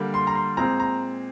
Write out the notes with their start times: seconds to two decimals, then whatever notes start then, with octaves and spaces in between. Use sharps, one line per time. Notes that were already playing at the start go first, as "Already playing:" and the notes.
Already playing: D3 G3 A#3
0.14 C6
0.27 A#5
0.35 C6
0.57 A#2 G#3 C4 A#5
0.80 A#5